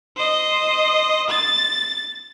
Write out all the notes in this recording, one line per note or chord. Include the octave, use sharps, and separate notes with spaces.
C5 D#5
A6